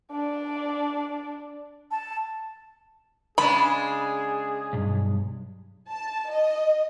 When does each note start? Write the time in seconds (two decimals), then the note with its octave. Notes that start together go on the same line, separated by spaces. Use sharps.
0.12 D4 D5
1.91 A5
3.38 C#3 G#3 D4 G#4 B5
4.73 B1 G2
5.89 A5
6.31 D#5